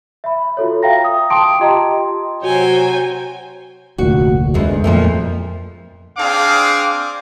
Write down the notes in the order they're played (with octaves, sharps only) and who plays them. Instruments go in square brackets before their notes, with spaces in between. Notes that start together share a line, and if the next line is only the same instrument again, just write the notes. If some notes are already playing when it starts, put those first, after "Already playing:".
[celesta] E5 B5
F4 F#4 A4 C#5
E5 F5 G5 A#5 A#6
D#6
G5 A5 C6 D6 D#6 D7
F4 G4 D#5 G5 A#5 C6
[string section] C3 C5 C#5 [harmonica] F#3 [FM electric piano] F#4 [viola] G5 G#5
[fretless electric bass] F1 D2 A#2 [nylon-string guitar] F#4
[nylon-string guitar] E2 G#2 [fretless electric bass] D3 G#3
[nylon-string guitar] F2 A#2 F3 [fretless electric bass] A3
[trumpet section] C4 D4 G#4 F5 D6